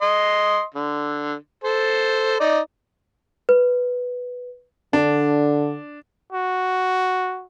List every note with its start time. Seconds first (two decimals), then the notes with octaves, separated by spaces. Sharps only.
0.02 D#5 C6
0.74 D3
1.64 A4 C5
2.40 D#4 D5
3.49 B4
4.93 D3 D4
6.32 F#4